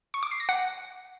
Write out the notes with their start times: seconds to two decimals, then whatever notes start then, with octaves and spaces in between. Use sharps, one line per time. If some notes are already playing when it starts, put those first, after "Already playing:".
0.14 C#6
0.23 D6
0.31 C7
0.40 A#6
0.49 F#5